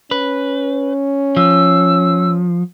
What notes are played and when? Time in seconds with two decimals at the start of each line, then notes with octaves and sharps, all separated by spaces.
0.11 C#4 B4
1.37 F3 E6